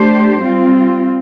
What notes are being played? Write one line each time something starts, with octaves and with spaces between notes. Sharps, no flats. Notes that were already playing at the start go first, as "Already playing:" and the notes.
Already playing: A3 D4 G4 C5
G3 C4 F4